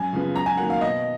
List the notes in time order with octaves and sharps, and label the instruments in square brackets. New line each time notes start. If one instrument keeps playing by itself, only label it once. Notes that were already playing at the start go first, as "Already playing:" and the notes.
Already playing: [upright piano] F#2 G#5
C#3 F3 B3
F#2 A#5
G#5
D#3 F#3 A#3 F#5
F5
B2 D#5